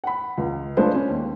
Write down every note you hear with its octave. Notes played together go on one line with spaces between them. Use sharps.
F#5 B5
C#2
G#3 D4 F4 A4 B4 C5
C#4
D#2